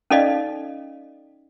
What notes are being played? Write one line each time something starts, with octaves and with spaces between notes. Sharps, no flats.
C#4 D#4 A4 D5 D#5 F5